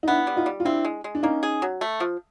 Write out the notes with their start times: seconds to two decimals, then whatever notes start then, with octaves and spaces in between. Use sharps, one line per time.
0.03 D#4
0.08 B3 D4 E4
0.27 G3
0.36 D#4 F4
0.46 G3
0.60 F4
0.65 C4 D4 E4
0.85 G#3
1.04 G#3
1.15 D4
1.23 A#3 C#4 D#4
1.43 G#4
1.62 F#3
1.81 A3
2.00 F3